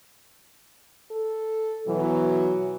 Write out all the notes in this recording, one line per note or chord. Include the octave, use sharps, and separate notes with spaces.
A4
B2 E3 F#3